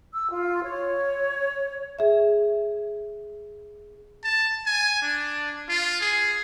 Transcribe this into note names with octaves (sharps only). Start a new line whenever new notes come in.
E6
F4
C#5
G#4 E5
A5
G#5
D4
F4
G#4